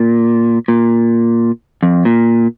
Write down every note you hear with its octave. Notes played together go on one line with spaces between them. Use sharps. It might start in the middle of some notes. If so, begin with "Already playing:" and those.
Already playing: A#2
A#2
F2
A#2